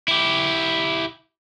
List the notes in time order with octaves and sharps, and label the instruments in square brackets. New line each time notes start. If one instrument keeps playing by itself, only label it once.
[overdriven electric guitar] E4 G4